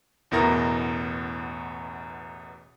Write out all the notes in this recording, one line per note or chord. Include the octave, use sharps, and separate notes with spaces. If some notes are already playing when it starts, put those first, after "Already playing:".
A1 E2 B2 E4 A#4 A#6